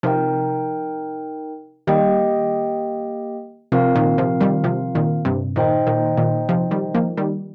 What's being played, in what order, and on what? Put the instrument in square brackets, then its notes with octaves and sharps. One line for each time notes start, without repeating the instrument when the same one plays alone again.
[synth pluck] C3 F3 [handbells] D#4 A#4 G5
[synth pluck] D#3 G3 [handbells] A#3 G4 D#5 G5
[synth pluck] C3 F3 [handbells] C4 F4 A#4 F5
[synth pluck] A#2 D#3
C3 F3
D#3 G3
C3 F3
A#2 D#3
G2 C3
[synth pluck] A#2 D#3 [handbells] D#4 C5 D#5 G5
[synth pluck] A#2 D#3
A#2 D#3
C3 F3
D#3 G3
F3 A#3
D#3 G3